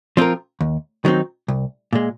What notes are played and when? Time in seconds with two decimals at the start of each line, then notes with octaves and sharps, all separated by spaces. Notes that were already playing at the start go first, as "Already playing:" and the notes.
0.17 F3 C4 F4 A#4
0.61 D#2
1.05 D#3 F#3 C4 D#4
1.48 C2
1.93 A#2 G#3